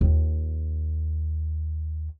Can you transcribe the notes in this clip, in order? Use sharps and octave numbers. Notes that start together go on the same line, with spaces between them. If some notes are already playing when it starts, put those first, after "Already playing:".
D#2 F4